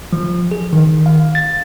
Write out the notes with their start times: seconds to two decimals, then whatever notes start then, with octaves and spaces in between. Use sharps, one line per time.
0.13 F3
0.51 G#4
0.73 D#3
1.06 F5
1.35 A6